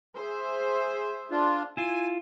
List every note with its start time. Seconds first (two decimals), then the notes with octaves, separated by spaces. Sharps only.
0.15 G#4 C5 E5
1.31 D4 F4
1.77 E4 F4 G#5